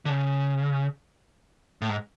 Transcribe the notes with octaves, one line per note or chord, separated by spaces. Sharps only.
D3
C#3
A2
G#2